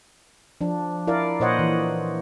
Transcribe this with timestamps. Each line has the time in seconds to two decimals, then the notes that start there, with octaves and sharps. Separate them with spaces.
0.61 F3 D4
1.07 E4 A#4 D5 F5
1.40 A#2 C5 C#5 D#5 F#5
1.59 E3